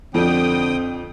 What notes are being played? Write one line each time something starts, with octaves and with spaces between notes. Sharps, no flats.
F2 D3 C4 G5 D#6